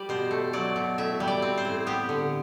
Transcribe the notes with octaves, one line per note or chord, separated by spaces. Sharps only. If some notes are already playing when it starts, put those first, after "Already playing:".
Already playing: G3 G4 D5
B2 C5
A3
F#3 D5
B2
A2 E5
G3
D5
C4
C5
A2
B3 G4
D3